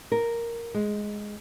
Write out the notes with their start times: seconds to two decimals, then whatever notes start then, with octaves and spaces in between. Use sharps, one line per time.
0.12 A#4
0.74 G#3